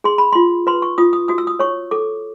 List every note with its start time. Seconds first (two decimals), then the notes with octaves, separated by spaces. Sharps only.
0.04 G#4 C6
0.18 B5
0.33 F4 C6
0.67 B4 C6
0.82 C#6
0.98 F4 D#6
1.13 D#6
1.28 F#4 D#6
1.38 E6
1.47 D#6
1.59 C#5 C#6
1.91 A4 D6